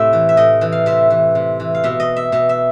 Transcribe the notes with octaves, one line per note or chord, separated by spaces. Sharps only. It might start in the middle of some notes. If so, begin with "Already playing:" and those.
Already playing: A2 C3 E5
E3
E5
A2 D#5
E3
F5
C3 E5
E3
C3
E3
F5
B2 E5
D#5
E5
B2 E5
E5